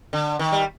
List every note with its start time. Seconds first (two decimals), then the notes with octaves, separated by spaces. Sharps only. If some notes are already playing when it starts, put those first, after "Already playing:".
0.13 D3
0.39 D#3
0.52 G3